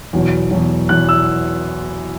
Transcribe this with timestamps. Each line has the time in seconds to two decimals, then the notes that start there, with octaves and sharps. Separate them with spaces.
0.13 E2 B2 F#3
0.51 E2 B2 F#3
0.89 E2 B2 F#3 F#6
1.09 E6